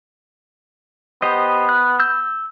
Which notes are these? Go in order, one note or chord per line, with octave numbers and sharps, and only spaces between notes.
B3 G4 C5 D#5
F#6
E6 G6